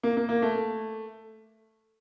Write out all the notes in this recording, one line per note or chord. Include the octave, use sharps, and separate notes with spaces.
A#3
A#3
A#3
A3